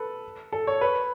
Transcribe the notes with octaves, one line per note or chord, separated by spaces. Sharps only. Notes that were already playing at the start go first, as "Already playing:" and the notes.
Already playing: A4 B4
A4
C#5
B4